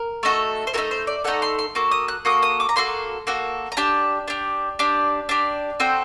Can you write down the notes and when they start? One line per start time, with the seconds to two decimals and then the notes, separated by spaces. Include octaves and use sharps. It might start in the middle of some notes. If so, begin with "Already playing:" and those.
Already playing: A#4
0.23 A3 D#4 F#4 A4
0.67 C5
0.73 A3 D#4 F#4 A4 A#4
0.91 C5
1.07 D5
1.24 A3 D#4 F#4 A4 F#5
1.42 C6
1.59 C6
1.75 A#3 F#4 A4 D6
1.91 D#6
2.08 F#6
2.25 A#3 F#4 A4 D#6
2.43 D#6
2.60 D6
2.69 A#5
2.76 A#3 F#4 A4 C6
3.27 A#3 F#4 A4
3.72 A#5
3.77 D4 G4 A5
4.28 D4 G4
4.79 D4 G4
5.29 D4 G4
5.80 C4 F#4 A4 G5